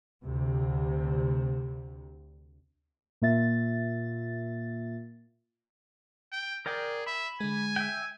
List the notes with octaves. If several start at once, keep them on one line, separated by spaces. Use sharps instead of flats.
D2 C3
A#2 A#3 F4 E5 A6
G5
G#4 A#4 D5 G5
E5 B5
D3 G#3 G#5
E5 G5